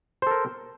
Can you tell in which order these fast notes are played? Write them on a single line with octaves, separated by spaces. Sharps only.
C5 A4 A#4